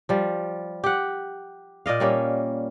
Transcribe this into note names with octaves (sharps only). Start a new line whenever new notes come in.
F3 G3
G4 F#5
A#2 D5 D#5 F5
G3 A#3 C#4